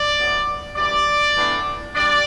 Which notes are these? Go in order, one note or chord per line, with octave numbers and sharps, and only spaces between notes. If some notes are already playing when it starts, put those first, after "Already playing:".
Already playing: D5
A2 F#3 B3
F#2 E3 G3 D5
A2 E3 B3 D4
G3 D4 D5